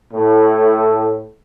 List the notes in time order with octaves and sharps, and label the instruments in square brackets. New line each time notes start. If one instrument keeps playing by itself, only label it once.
[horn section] A2